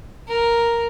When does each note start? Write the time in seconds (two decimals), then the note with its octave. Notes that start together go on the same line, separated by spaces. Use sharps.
0.28 A#4